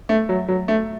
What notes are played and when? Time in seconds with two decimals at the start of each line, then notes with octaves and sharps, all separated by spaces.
0.09 A3
0.29 F#3
0.48 F#3
0.68 A3